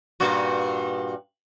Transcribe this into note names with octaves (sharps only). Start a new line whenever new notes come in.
G2 A#2 F#4